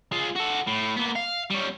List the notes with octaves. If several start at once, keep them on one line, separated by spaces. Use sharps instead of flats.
G#3 F4
F#4 A4
A2
A#3 B3
F5
G3 C#4